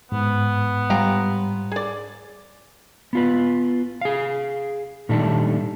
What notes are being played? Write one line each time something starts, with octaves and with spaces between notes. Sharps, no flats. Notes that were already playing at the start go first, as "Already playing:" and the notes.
G#2 B3
G3 G4 F5 A#5
G#4 D5
B3 F4 B4
G#4 F5
A#2 D#3 G3 A3 D4 A4